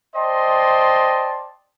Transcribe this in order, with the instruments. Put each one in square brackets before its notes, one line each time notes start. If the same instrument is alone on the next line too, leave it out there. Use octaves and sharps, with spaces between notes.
[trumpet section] C5 D5 D#5 G5 A5 C6